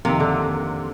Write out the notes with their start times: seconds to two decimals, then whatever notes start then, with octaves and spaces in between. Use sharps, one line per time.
0.05 F2 C3 D#3 A#3 E5
0.20 D3